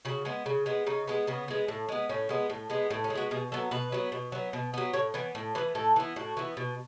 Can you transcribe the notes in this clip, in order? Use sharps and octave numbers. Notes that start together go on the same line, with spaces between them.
C#3 F#4
G#3 B3
C#3
G#3 B3
C#3 D#4
G#3 B3
C#3 B3
G#3 B3
A2
G#3 B3
A2 C#4
G#3 B3
A2
G#3 B3
A2 B3
C#4
G#3
B3 F#4
B2 G#4
F#3 B3 A4
B2 B4
F#3 B3
B2
F#3 B3
B2
F#3 B3
A2 C#5
E3 B3 C#5
A2
E3 B3 B4
A2 A4
E3 B3
A2 F#4
E3 B3
B2